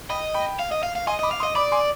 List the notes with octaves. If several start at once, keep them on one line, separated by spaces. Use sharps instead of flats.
D#5 G5 B5
G5 B5
F5
D#5
F5
F5
D#5 G#5 C6
D#5
B5 D6
F5
C6 D#6
D#5
D5 B5 D6
G#5 C6